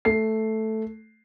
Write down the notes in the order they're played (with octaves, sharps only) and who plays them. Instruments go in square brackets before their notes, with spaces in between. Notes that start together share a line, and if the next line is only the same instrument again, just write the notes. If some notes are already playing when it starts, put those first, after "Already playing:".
[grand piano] A3 C7